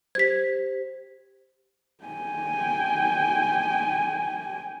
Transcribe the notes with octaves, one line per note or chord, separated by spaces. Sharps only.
G4 C5 G#6 B6
G5 G#5